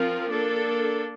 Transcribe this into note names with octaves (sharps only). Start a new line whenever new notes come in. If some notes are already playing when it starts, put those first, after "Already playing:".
Already playing: F3 C4 F4 A#4
A#3 D4 A4